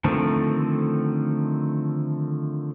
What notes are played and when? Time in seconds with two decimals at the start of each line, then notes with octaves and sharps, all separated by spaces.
0.04 D3 D#3 F3 A3 C4